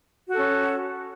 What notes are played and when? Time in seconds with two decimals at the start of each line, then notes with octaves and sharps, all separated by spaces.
0.30 F#4
0.33 A4
0.37 C#4